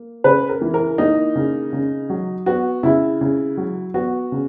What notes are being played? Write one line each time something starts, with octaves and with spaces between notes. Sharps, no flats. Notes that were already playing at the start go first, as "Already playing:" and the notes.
Already playing: A#3
C#3 B4
A#4
E3
A#4
A#3 D#4
C#3
C#3
F#3
B3 F#4
C#3 E4
C#3
F#3
B3 F#4
C#3